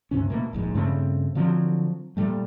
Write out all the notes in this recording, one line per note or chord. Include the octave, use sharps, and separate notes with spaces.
D2 G2 C3 C#4
B2 A3 A#3
D1 A#1 G#2 G#3
G2 C#3 A3 C4
D3 F3 F#3 C4
A#2 G3 A3